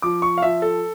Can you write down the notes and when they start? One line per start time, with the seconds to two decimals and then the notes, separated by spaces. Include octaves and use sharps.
0.02 F3 D6
0.22 C#6
0.38 F5
0.42 F3 E5
0.62 A4